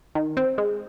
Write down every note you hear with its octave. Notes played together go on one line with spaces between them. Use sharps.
D#3
C4
G#3